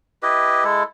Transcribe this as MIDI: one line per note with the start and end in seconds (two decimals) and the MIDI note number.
0.23 0.64 64
0.23 0.64 67
0.23 0.64 71
0.23 0.64 75
0.64 0.83 56
0.64 0.83 64
0.64 0.83 69